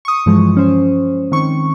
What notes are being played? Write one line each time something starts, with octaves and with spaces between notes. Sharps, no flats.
C#6 D#6
G2 E3 F3 G#3
C#4 C5
D#3 C4 C#6